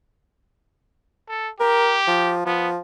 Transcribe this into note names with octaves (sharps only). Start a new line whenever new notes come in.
A4
G4 A#4
F3
F3 B3